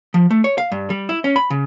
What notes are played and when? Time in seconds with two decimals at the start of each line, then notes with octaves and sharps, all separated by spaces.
0.14 F3
0.31 A3
0.44 C#5
0.58 F5
0.72 G2
0.90 G3
1.09 E4
1.24 C#4
1.36 B5
1.50 C#3